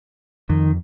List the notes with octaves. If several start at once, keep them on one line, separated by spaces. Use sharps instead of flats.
F2 D#3